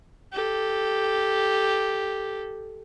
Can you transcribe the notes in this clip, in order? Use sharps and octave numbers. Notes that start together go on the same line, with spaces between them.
G4 A4